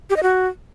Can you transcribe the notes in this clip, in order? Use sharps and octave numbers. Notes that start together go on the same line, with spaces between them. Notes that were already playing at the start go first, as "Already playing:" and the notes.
G4
D#5
F#4